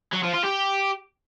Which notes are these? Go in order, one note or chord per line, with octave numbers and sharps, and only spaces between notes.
F#3
F3
F4
G4